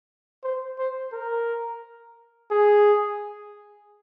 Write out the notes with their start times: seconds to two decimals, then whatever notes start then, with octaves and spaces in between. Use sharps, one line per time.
0.44 C5
0.79 C5
1.13 A#4
2.51 G#4